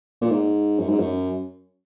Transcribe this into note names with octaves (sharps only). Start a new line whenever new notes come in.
A#2
G#2
F#2
G#2
F#2